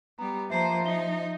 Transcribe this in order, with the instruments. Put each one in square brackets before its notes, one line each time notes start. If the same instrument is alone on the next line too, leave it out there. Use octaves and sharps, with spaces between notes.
[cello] G3 B3 [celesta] A#5
[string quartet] F3 [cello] A#3 C5 [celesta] E5 A5 A#5
[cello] D#4 [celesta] E5 G7